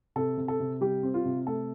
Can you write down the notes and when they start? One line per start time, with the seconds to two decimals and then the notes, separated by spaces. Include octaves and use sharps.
0.16 C3 A4
0.38 C3
0.48 A4
0.60 C3
0.81 G3 G4
1.03 C4
1.14 F4
1.25 C3
1.47 A3 A4